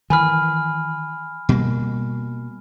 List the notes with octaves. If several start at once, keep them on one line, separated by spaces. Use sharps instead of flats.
D#3 E3 G#5 B5 F6
B2 G3 A#3